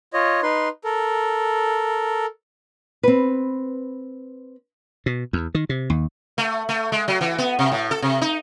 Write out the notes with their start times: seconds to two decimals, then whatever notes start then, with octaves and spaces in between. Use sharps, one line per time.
0.14 F4 C#5 D#5
0.43 D#4 B4 C6
0.84 A4 A#4
3.03 C4 B4
5.06 B2
5.33 E2
5.55 D#3
5.69 C3
5.90 D#2
6.38 A3
6.69 A3
6.92 G#3
7.08 F#3
7.21 E3
7.38 B3
7.59 C3
7.72 A2
7.91 A4
8.02 C3
8.21 D#4